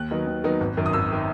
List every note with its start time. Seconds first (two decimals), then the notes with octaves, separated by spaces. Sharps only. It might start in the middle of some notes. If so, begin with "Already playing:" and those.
Already playing: D#2 F#6
0.11 D#3 F#3 B3 D#4
0.27 D#2
0.44 D#3 F#3 B3 D#4
0.60 G#1
0.77 F#2 D#3
0.86 D#6
0.93 G#1 E6
1.12 D#3